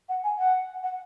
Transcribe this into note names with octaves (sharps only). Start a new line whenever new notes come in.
F#5
G#5
F#5
F#5